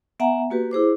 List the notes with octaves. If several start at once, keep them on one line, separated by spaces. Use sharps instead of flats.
B3 E5 F#5 G#5 A#5
A#3 F#4 G4 B4
E4 G#4 C5 D6